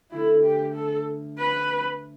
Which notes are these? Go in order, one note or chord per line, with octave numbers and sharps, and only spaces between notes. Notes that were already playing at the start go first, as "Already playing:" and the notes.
D2 D3 A3 D4 E4
G4
A4
B4